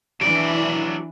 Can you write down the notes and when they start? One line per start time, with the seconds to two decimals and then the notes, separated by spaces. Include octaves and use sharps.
0.21 E3 F#3 D4 E4 D5 D7